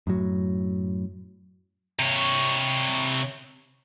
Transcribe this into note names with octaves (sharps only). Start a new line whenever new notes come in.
F#2 A2 F#3
C3 C#5